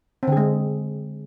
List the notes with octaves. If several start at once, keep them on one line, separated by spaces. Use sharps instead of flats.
D3 G#3 C4 G#4